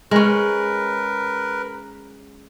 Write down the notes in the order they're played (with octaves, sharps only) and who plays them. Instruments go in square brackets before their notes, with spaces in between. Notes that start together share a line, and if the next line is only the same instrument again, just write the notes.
[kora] G#3 C#4 [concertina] A#4 B4